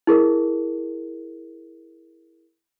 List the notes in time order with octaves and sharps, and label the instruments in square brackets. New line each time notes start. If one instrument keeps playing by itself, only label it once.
[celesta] E4 G#4 A#4